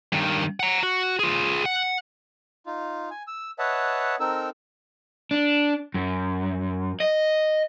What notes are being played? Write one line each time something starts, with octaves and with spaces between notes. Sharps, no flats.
G2 D#3
F#5 A#5
F#4
F4 G#4
F#5
D#4 F4
G#5
E6
B4 C#5 D#5 E5 F#5 A5
C4 D#4 A4 A#4 E6
D4
F#2
D#5